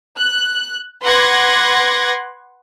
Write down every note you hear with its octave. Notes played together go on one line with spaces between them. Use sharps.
F#6
B4 F#5 C6 D6 G#6 A#6